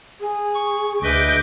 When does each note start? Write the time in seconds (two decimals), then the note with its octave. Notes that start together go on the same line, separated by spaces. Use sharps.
0.20 G#4
0.54 C#6
1.03 D2 B4 D#5 E5 D6 G6